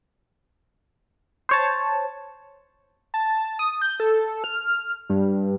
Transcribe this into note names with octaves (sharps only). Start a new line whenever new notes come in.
C5 C#5 A5
A5
D#6
G6
A4
F6
G2